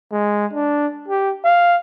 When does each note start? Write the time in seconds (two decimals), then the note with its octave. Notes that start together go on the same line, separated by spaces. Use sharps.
0.12 G#3
0.53 D4
1.08 G4
1.44 F5